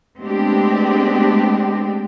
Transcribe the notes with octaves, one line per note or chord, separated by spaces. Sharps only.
G#3 A3 B3 C4 D4 G4